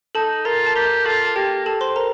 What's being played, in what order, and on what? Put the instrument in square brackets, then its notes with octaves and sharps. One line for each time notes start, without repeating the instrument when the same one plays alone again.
[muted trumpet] D#4 [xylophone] A4 A5
[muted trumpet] F4 [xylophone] A#4 A#5
[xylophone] A5
[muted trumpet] G4 [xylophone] A#4 A#5
[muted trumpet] F4 [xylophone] A4 A5
[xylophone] A5
[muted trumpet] A#3 [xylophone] G4 G5
[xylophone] A4 A5
C5 C6
A#4 A#5